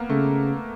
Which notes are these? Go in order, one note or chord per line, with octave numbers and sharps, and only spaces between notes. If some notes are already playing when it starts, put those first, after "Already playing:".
Already playing: A#3 B3
C#3 A3